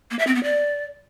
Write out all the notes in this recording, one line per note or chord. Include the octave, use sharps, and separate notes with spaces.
A#3
E5
C4
B3
D5